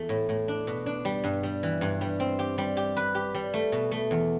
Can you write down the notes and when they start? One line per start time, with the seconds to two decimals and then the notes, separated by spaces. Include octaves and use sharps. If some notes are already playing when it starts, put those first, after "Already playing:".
Already playing: E2 A3
0.09 A2
0.29 A2
0.48 D4
0.67 B2
0.86 D4
1.05 G3
1.24 G2
1.43 G3
1.63 E3
1.81 G2
2.01 G3
2.20 C4
2.39 G4
2.58 G3
2.77 G4
2.97 B4
3.15 G4
3.34 G3
3.54 A3
3.72 B2
3.91 A3
4.11 E2